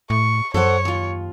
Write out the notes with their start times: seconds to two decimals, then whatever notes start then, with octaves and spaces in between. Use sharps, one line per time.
0.10 A2 C#6
0.54 F#2 A4 C5 C#5 F#5
0.85 D#2 F4